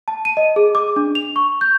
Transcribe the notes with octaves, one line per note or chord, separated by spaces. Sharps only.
A5
D#7
D#5
G#4
D6
D4
F7
C#6
G6